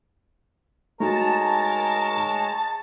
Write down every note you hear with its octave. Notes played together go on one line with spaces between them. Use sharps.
G#3 A3 D#4 F#4 A#4 C#5 A5 A#5